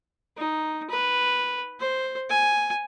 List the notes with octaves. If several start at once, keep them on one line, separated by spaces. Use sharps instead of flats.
D#4
B4
C5
G#5